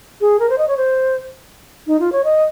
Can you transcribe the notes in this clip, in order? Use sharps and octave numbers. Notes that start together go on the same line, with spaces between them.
G#4
A#4
C5
D#5
C#5
C5
D#4
F4
C#5
D#5